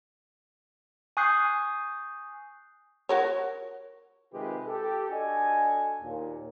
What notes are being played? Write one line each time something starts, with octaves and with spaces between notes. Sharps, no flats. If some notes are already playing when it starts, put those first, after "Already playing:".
G#5 C#6 D#6 F#6 G6 C7
F#4 A#4 C#5
C3 D#3 G#3 F4 G4 B4
G4 A4
D4 F#4 A4 D#5 G#5
D#2 A#2